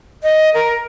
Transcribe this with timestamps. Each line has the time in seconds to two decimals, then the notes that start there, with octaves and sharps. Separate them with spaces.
0.23 D#5
0.54 A#4